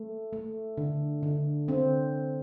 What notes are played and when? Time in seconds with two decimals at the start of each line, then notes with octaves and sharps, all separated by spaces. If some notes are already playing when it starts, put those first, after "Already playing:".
Already playing: A3
0.33 A3
0.77 D3
1.23 D3
1.68 D3 C4